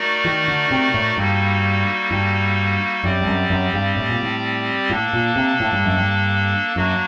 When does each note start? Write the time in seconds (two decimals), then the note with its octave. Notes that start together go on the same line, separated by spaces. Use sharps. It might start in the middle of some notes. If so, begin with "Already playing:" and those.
Already playing: A3 D#4 F#4 A#4 D5
0.25 D#3
0.48 D3
0.71 C3
0.94 A2
1.17 G2 G3 A#3 D#4 F#4 A4
2.11 G2
3.04 F#2 G3 C4 G4 D5
3.21 G2
3.27 F#2
3.50 F#2
3.74 G2
3.96 A2
4.09 A#2
4.22 A2
4.89 A2 A#3 D4 A4
5.13 A#2
5.36 C3
5.60 A2
5.72 G2
5.85 F#2
5.97 G2
6.76 F#2 F#3 A#3 D4 F#4